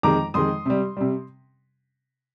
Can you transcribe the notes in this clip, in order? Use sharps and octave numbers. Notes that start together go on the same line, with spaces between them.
F2 D#3 G#3 A#5 D6
F2 D#3 G#3 C6 D#6
C3 G3
C3 G3